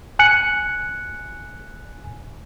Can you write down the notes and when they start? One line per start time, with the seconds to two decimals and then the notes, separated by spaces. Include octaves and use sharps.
0.19 G#5 F#6 C#7